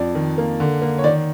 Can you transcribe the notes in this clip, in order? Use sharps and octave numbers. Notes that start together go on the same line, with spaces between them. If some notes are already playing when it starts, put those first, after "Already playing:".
Already playing: F2 D5
D#3
A#3
D3
A#3
C#5
D#3 D5